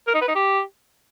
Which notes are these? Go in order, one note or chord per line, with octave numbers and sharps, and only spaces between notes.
A#4
D#4
B4
D#4
G4